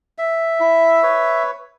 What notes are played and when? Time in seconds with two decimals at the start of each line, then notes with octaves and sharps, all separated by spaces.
0.18 E5
0.60 E4
1.03 B4 C#5